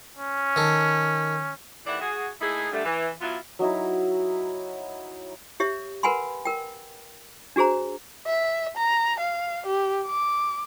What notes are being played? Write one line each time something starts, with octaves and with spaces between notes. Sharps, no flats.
C#4
D#3 A4
D#2 E3 A3 D5 E5 F#5
F#4 G#4
A3 A#3 D#4 E4 G#4
D3 G3 A3
E3
F#3 B3 E4 F4
F#3 D#4 E4
G4 C#5 E5
A#4 B4 F#5 G#5 B5 C6
A#4 G5
D4 F#4 G#4 C5 A#5
E5
A#5
F5
G4
D6